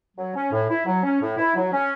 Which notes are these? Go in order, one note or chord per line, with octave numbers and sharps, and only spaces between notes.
F#3
C#4
A2
E4
F#3
C#4
A2
E4
F#3
C#4